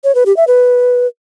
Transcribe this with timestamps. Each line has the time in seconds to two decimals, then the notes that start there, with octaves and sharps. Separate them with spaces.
0.04 C#5
0.15 B4
0.26 G4
0.37 E5
0.47 B4